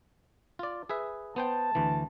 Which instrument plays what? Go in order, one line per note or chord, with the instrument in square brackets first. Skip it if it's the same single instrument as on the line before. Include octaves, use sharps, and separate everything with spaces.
[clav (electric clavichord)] F4 D5
G#4 B4 E5
[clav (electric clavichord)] B3 C5 G5 [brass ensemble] A5
[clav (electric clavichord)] D2 E3